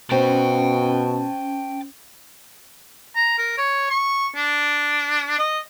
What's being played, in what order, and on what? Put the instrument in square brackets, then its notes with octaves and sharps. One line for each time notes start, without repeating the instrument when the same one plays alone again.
[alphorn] B2 [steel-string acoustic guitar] C4 [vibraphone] C#4 [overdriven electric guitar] G5 A5
[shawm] A#5
A#4
C#5
C#6
D4
D#5